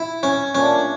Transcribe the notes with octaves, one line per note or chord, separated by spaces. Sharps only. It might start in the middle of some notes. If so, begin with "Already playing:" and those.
Already playing: E4
C#4
A#2 A3 C#4 D4